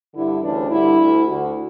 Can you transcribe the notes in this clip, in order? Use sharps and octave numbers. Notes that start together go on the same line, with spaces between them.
G2 D3 E4
D2 C#3 E3 D4
G2 D3 E4
D2 D3
D2 D3 F#4